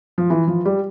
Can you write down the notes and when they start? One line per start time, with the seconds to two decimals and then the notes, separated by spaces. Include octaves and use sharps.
0.18 F3
0.30 E3
0.47 F3
0.66 G3